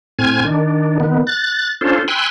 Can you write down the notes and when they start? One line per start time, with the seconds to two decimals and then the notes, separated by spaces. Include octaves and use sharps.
0.19 A2 C4 G#5 F6 G#6
0.45 D#3 D4
1.00 D#3 B3
1.27 F#6 A6
1.81 C#4 D4 F4 A4 C5
2.08 G5 G#5 B5 C6 E6 F#6